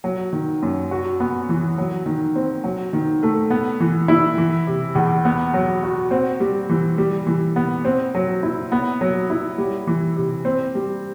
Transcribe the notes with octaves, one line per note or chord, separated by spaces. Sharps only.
F#3
D#3
F#2
F#4
B3
E3
F#3
D#3
C4
F#3
D#3
A3
B3
E3
E4
E3
C3
E2
B3
F#3
F#4
C4
G3
E3
G3
E3
B3
C4
F#3
E4
B3
F#3
E4
G3
E3
C3
C4
G3